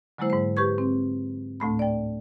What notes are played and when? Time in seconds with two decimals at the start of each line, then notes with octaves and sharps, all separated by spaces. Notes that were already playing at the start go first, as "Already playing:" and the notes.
0.18 D3 F#3 G#3 A#3 E4 C5
0.30 G#2 C5
0.57 G4 B4 C#6 G#6
0.78 C4
1.60 D2 A2 A3 B5
1.79 D5 G5